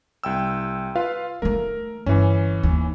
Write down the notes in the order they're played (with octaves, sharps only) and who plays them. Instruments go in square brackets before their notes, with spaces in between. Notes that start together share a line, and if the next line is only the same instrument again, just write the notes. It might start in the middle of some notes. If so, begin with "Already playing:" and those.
[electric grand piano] C2 G5 E6
F4 B4 F5
[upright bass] D#3 A3 [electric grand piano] A#4
[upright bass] G1 [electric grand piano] E3 C#4
[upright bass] D#2